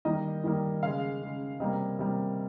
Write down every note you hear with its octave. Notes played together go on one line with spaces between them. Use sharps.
D#3 G3 A#3 D#5
D#3 G3 A#3
C#3 G#3 F5
C#3 G#3
C3 G3 A#3 D#5
C3 G3 A#3